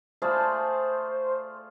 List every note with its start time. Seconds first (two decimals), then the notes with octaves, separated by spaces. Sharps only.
0.22 A3 F4 G#4 C5 D5 A5 B5